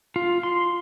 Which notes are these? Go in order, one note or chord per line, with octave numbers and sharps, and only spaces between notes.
F4
C6